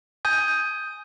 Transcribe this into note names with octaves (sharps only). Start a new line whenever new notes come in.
G#5 D#6 G6